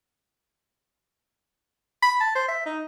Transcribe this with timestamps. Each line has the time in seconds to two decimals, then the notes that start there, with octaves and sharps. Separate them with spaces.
2.03 B5
2.21 A5
2.35 C5
2.48 E5
2.66 D#4